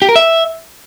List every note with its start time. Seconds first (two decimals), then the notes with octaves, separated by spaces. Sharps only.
0.02 G4
0.09 A#4
0.16 E5